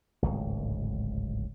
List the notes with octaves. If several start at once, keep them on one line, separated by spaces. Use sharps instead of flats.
D1 G#1 C#2